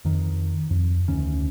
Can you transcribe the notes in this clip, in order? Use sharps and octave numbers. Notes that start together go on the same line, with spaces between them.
F2 D#3
F2
D2 D#3 C#4